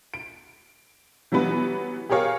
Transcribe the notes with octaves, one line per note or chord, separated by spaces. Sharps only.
D7
E3 F#3 G3 B3 B4
G4 G#4 A#4 C#5 F5